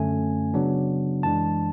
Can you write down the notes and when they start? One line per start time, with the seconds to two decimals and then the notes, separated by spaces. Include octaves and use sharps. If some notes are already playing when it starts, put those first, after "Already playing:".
Already playing: F#2 D3 A3 C#4 G#5
0.54 C#3 F#3 B3 D4
1.23 F#2 E3 G#3 D4 A5